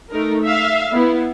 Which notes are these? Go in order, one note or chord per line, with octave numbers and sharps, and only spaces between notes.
A3 D#4 A#4
E5 F5
B3 E4